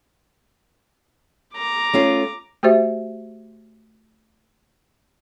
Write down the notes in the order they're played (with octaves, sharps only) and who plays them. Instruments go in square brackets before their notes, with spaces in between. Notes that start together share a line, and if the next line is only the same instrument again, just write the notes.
[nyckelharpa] A#5 D6
[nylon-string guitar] A3 C#4 F4
[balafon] A3 F#4 G4 C5 E5